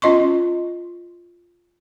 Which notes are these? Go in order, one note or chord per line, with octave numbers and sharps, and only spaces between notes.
C#4 F4 D#5 C6 C#6